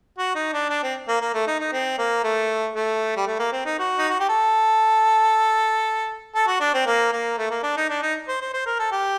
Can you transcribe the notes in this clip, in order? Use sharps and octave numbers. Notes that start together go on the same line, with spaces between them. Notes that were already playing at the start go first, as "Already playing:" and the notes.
F#4
D#4
D4
D4
C4
A#3
A#3
A3
D#4
D#4
C4
A#3
A3
A3
G3
A3
A#3
C4
D#4
F#4
D#4
F#4
G4
A4
A4
F#4
D4
C4
A#3
A#3
A3
A#3
D4
D#4
D4
D#4
C5
C5
C5
A#4
A4
G4